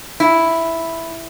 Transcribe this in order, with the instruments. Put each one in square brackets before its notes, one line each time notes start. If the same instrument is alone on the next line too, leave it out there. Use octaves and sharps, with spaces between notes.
[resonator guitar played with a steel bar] E4